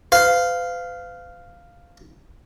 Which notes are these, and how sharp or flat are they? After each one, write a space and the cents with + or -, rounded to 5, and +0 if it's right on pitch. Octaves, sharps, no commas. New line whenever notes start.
B4 +45 F5 +0